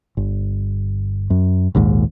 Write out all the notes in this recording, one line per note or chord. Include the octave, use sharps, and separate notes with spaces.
G1
F#2
A#1 D#2 G#2